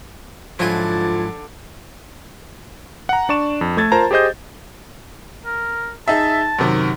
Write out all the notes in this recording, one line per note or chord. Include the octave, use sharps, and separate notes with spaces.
G#2 D3 F3 F#3 E4 F4 G#5
F#5 A#5
D4 D5 C#6 E7
F2
A3 A4 G#6 A6
F4 A#4 C5 A5 A#5
G4 G#4 C5 D#5 G6
A#4
D#4 G#4 E5 A5
F#2 C3 D#3